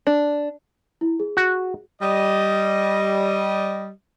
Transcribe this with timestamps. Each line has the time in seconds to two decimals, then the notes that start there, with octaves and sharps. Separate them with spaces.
0.07 D4
1.01 E4
1.19 G#4
1.37 F#4
2.02 G3 D#5